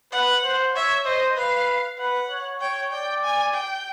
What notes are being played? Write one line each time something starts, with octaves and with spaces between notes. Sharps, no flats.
B4 F#5
C5
C#5 E5
C5 D#5
B4 F5
B4 F#5
C#5
C#5 G5
D5 G5
G#5
G5